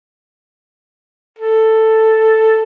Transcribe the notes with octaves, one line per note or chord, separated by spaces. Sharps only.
A4